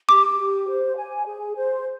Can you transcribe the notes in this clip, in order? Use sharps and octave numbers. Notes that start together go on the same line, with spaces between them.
G4 D6
G4
C5
G#5
G#4
C5